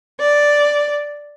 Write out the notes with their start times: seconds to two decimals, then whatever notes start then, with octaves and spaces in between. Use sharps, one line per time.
0.19 D5